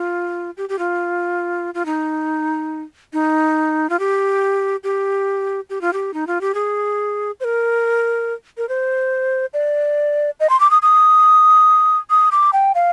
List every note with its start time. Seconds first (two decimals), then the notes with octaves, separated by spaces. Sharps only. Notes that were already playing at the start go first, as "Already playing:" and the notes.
Already playing: F4
0.57 G4
0.69 G4
0.79 F4
1.74 F4
1.86 D#4
3.13 D#4
3.90 F4
3.99 G4
4.84 G4
5.70 G4
5.81 F4
5.93 G4
6.14 D#4
6.27 F4
6.41 G4
6.54 G#4
7.40 C5
7.44 A#4
8.58 A#4
8.69 C5
9.54 D5
10.40 D#5
10.50 C6
10.60 D6
10.71 D#6
10.82 D#6
12.10 D#6
12.32 D6
12.53 G5
12.75 F5